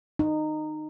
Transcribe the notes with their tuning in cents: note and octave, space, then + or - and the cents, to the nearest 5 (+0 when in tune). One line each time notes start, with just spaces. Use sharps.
D#4 -20